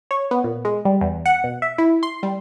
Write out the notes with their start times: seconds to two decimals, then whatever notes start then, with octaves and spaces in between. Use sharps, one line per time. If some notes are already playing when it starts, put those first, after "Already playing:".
0.11 C#5
0.31 B3
0.44 A#2
0.65 G#3
0.85 G3
1.01 E2
1.26 F#5
1.44 B2
1.62 E5
1.78 E4
2.03 C6
2.23 G3